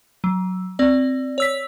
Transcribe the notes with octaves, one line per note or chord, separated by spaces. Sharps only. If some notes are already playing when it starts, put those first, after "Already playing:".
F#3
C4 D5
C#5 E6 B6